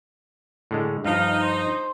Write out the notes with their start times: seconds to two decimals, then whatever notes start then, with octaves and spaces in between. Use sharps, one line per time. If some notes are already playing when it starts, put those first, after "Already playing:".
0.71 A2 D3 G#3
1.05 G2 F3 D#4 F5
1.42 C5